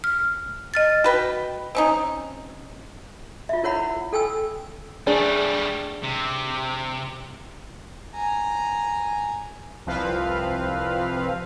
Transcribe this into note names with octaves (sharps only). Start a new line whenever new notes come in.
F6
D#5 F6 A6
F#4 B4 G5
C4 C#4 D#4
F4 E5
E4 A#4 C#5 F#5 B5
A4 G5 G#5 E6
G3 A3 D4 G#4
C3
G#5 A#5
C2 F3 C4 B4 F5